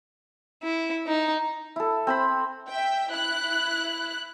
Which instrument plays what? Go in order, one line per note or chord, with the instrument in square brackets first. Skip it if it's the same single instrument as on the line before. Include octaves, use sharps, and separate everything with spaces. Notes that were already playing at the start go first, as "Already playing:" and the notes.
[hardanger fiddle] E4
D#4
[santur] E4 A4
C4 C5 B5
[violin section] E5 G5
E4 F#6